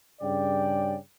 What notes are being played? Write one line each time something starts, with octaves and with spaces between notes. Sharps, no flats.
G2 C#3 D5 G5